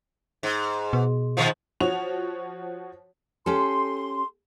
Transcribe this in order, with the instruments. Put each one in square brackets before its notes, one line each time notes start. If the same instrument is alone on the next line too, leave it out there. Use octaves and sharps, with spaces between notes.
[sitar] G#2
[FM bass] B2
[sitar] G#2 D#3 F3
[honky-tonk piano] F3 F#4 C#5 F7
[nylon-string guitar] C#4 G4 A4 [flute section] C6